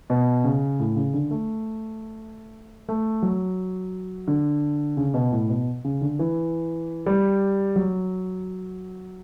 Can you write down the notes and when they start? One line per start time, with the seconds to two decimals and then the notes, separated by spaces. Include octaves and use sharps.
0.10 B2
0.44 C#3
0.79 A2
0.96 C#3
1.14 D3
1.31 A3
2.89 A3
3.22 F#3
4.28 D3
4.97 C#3
5.14 B2
5.32 A2
5.49 B2
5.85 C#3
6.01 D3
6.19 E3
7.06 G3
7.76 F#3